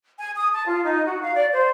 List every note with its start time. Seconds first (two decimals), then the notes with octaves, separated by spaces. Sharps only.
0.19 G#5
0.36 D#6
0.53 A5
0.66 F4
0.84 D#4
1.05 F#4
1.22 F5
1.36 D5
1.52 C5